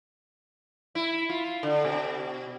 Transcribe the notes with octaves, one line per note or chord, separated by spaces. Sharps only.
E4
F4
D3
B2